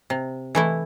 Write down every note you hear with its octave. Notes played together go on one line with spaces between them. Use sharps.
C3
E3 A3 E4